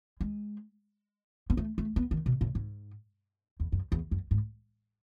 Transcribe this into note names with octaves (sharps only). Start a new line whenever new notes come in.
G#3
B3
A3
A3
B3
D#3
B2
A2
G#2
E2
F#2
E2
F#2
G#2